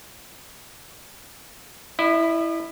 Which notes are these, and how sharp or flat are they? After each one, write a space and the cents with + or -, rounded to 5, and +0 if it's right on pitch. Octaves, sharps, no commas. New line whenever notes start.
E4 +0 D#5 -40